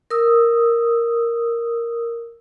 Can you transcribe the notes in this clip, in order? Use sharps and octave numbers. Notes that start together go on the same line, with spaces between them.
A#4 D#6 E6